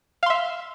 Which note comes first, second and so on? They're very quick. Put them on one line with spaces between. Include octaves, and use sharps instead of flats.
F5 C6 E5